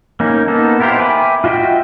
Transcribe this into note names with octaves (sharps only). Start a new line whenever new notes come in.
A#3 C#4 D#4
A#3 B3 D#4 A4
B3 E4 G4 A#4 C5
E5 G5 G#5 B5 D6
F4 F#4 D#5 E5 G5